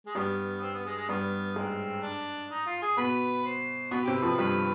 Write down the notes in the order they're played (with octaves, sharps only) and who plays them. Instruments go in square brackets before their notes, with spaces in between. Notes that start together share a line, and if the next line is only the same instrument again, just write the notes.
[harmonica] G#3
[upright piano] G2 G3 [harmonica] B3
[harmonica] C4
B3
G#3
G#3
[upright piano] G2 G3 [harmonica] B3
[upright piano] G#2 G#3 [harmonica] C4
[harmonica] D4
D#4
F4
G#4
[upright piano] B2 B3 [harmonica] B4
[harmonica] C5
[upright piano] B2 B3 [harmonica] B4
[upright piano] C3 C4 [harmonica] G4
[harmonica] B4
[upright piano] F2 F3
[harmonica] B4
[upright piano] G2 G3 [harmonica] B4